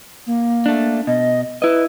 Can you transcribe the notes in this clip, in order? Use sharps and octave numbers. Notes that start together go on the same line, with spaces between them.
A#3
A3 D4
B2 D#5
E4 B4 D#5